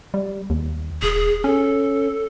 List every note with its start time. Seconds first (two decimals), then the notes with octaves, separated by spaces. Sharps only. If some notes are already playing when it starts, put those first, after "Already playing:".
0.14 G3
0.50 D#2
1.03 D#1 G#4
1.44 C#4 A4